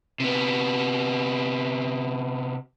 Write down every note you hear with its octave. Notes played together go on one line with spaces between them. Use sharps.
C3 B3